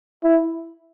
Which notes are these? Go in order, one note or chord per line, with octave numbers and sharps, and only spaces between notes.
E4